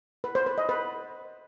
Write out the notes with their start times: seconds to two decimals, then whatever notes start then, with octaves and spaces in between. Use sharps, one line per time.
0.24 B4
0.35 C5
0.46 B4
0.58 D#5
0.69 B4